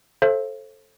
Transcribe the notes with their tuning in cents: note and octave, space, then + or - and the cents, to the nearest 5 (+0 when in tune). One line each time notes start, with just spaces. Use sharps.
A4 +0 C5 +30 E5 +45